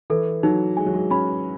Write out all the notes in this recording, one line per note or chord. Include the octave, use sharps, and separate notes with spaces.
E3 A4
F#3 D#4
G#3 G#5
F#3
G#3
C#4 B5